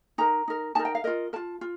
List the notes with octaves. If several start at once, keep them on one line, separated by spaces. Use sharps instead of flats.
D#4 A#4 A#5
D#4 A#4
D#4 A#4 A5
G5
F5
F4 A#4 D#5
F4 A#4 A5
F4